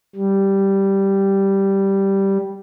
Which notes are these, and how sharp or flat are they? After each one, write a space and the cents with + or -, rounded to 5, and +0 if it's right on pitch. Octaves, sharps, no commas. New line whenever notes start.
G3 -5